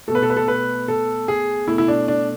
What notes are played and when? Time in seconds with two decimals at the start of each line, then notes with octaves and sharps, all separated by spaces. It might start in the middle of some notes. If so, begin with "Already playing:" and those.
0.08 B2 A3 A4
0.15 B4
0.23 A4
0.30 B4
0.37 A4
0.48 B4
0.88 A4
1.28 G#4
1.68 B2 A3 E4
1.78 E4
1.88 D4
2.08 D4